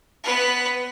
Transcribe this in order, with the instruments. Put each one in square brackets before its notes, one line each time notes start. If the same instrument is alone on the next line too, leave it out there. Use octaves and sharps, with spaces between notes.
[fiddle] B3 B4